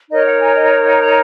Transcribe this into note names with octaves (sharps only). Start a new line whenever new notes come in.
D#4 A#4 C#5 D#5
F#5
G#5
D#5
F#5
A#5